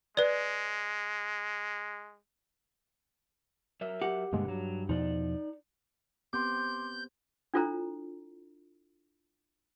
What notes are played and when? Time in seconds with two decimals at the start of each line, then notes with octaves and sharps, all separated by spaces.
0.17 G#3 B4 D5
3.81 F#3 A#4 E5
4.02 G4 F#5
4.33 G2 B2 D3 G3 G#3 A#3
4.48 G2 F#3
4.89 E2 B2 F3 D#4 D5
6.33 B3 C4 G4 C6 D6 G6
7.54 D4 E4 F4 A4 C5 A#5